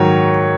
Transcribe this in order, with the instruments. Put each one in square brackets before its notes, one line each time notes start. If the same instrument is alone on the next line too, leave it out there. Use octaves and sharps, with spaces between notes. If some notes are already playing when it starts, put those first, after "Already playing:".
Already playing: [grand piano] G#2 D#3 F#3 C#5